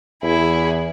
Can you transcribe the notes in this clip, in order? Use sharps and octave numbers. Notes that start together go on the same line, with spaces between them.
E2 E4 G#4